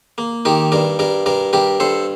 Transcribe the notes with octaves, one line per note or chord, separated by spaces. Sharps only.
A#3
D#3 G4 A#4
G2 A#4 D5
G2 A#4 D5
G2 A#4 D5
G2 G4 A#4
G2 A4 C5